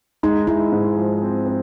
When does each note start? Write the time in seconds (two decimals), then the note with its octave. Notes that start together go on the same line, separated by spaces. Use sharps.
0.23 G#3 D#4
0.47 G#3 E4
0.72 G#2
0.97 F3
1.22 C4
1.46 C4